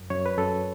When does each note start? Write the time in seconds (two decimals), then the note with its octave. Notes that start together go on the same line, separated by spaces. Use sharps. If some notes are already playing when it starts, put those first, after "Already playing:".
Already playing: F#2
0.10 F#2 C#5
0.26 B4
0.38 F#2 A4